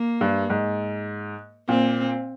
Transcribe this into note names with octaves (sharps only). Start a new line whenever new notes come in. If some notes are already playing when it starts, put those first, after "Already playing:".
Already playing: A#3
G2
G#2
A#2 C4